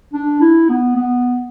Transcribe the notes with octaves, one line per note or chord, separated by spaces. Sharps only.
D4
E4
B3
B3